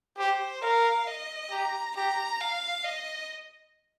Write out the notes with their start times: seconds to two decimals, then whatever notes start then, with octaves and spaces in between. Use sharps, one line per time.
0.18 G4 C5
0.62 A#4 F5
1.07 D#5
1.51 G4 A#5
1.96 G4 A#5
2.40 F5
2.85 D#5